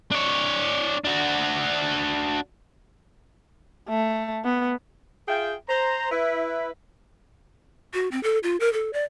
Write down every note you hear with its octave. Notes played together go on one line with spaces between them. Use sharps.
D4 C#5
D4 F#4
A3
B3
F4 G#4 E5 G5
C5 A#5
E4 B4
F#4
C4
A4
F4
A#4
A4
D5